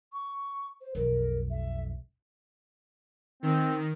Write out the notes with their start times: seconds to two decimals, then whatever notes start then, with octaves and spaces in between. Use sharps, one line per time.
0.13 C#6
0.81 C5
0.95 B1 F2 A#4
1.50 E5
3.43 D#3 C4